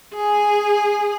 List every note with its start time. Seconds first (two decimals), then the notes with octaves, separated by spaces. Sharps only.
0.14 G#4